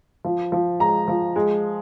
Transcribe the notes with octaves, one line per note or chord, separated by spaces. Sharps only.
F3
F3
G#3 A#5
F3
G#3